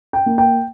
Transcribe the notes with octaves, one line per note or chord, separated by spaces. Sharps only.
G5
A#3
G5